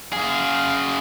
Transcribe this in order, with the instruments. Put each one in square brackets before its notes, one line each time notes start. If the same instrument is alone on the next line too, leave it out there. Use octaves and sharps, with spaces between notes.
[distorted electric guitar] F#2 G#4 [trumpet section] F5